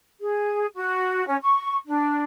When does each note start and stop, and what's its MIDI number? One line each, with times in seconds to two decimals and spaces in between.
0.20 0.66 68
0.75 1.25 66
1.27 1.35 61
1.41 1.76 85
1.86 2.24 62